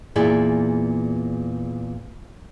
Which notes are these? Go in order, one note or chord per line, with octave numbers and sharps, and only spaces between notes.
E2 A#2 E4 G#4 D5